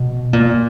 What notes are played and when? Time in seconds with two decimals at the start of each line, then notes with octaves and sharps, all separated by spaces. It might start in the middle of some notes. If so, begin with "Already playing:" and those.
Already playing: B2
0.33 A#2